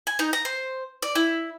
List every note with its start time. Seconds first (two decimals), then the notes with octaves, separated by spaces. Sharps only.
0.07 G#5
0.19 D#4
0.33 A#5
0.45 C5
1.02 D5
1.15 E4